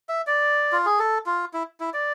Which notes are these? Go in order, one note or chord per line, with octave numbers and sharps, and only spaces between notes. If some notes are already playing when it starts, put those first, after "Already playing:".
E5
D5
F4
G#4
A4
F4
E4
E4
D5